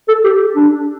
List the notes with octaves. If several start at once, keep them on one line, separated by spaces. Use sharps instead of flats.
A4
G4
D4